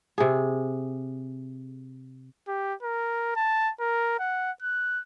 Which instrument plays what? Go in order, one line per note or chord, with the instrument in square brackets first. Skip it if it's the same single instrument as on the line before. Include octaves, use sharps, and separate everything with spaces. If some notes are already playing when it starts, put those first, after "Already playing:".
[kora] C3 G#4
[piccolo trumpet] G4
A#4
A5
A#4
F#5
F#6